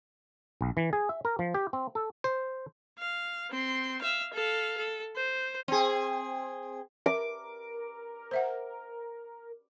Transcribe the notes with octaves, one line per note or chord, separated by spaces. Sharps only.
B1
E3
G#4
E5
A#4
F3
G4
C4
A4
C5
F5
C4 C6
E5 F5
A4 F5
A4
C5
C4 G#4
A#4 E5 D6
C5 E5 F#5